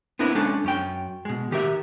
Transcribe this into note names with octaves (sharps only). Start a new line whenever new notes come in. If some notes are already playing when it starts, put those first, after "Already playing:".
B3 C4 D4 E4 A#4
G#3 C#4 D4 A4 A5
F#2 C#4 G5
B2 G#3
D#3 G4 A#4 E5